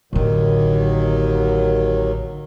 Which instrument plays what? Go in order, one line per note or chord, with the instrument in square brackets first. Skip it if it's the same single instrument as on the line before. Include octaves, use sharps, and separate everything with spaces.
[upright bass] A1 D3 [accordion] D#2 D#3 F#3